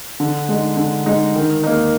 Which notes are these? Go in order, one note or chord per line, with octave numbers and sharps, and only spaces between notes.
D3
G#3 D#4
D3
G#3 D#4
D#3
A#3 D#4